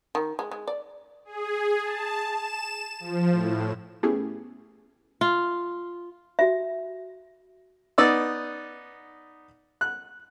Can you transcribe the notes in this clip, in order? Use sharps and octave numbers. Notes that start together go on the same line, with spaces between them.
D#3
G#3
G#3
D5
G#4
A5
E7
F3
A2
A3 B3 C#4 E4 G4 G#4
F4
F#4 E5
B3 D#4 D5 E6
F#6